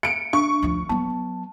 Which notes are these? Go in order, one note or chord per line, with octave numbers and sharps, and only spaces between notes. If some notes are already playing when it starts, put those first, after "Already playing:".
C#7 D7
D4 C#6
D2 F3
F#3 B3 A5